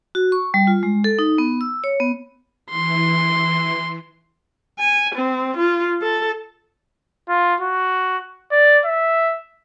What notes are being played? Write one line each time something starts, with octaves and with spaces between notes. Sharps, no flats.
F#4
C#6
G3
F4
G#3
A4
D#4
B3
E6
C#5
B3
E3 C6
G#5
C4
F4
A4
F4
F#4
D5
E5